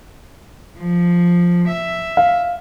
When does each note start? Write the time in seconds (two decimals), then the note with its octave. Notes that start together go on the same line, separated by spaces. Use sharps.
0.78 F3
1.68 E5
2.17 F5